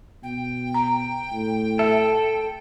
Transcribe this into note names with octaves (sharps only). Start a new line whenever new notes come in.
B2 G5
A#5
A2
A4 E5